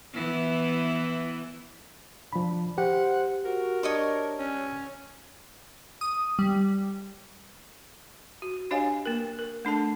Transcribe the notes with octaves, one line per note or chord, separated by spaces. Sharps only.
E3 B3 E4
F3 D4 B5
G4 C5 F#5
F#4 A#4
D4 C#5 D#5 C#6
C#4
D#6
G3
F#4
D4 G4 C#5 D#5 F5 G#5
A#3 A#4
A#4
A3 D4 A4 A5